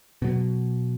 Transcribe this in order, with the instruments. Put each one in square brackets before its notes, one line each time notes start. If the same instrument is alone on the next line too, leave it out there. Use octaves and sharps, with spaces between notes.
[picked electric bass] B2 F#3